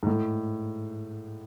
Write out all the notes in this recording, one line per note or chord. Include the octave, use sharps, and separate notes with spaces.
G#2
A2